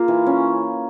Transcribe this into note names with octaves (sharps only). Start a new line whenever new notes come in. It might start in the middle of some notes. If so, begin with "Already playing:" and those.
Already playing: A#3 F4
E3
C#4